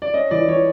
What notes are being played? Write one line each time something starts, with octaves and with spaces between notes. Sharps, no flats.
D5
C#4 D#5
E3 D5
E3 C#5